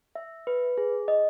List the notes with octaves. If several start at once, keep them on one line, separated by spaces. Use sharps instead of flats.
E5
B4
G#4
D#5